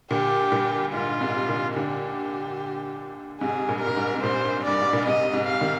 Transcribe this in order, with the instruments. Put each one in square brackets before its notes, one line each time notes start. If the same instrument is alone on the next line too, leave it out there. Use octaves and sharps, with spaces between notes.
[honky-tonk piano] A#2 D3 [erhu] G4
[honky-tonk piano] G2 A#2
[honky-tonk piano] G#2 [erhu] F4
[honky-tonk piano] G#2 C3
A#2 D3
[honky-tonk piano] A#2 D3 [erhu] G4
[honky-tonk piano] G#2 C3 [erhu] G#4
[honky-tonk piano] G2 A#2
[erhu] A#4
[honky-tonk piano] A#2
G#2
C3
[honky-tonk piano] G2 A#2 [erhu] C5
[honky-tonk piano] G2 [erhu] D5
[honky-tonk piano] G#2
A#2
[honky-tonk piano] G#2 C3 [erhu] D#5
[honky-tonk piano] G#2 C3
[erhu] F5
[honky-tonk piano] C3 D#3